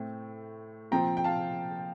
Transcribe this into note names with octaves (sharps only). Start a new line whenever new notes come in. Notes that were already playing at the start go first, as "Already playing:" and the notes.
Already playing: A2 A3 C4
A#2 F3 C4 G5 A#5
G5
F5 A5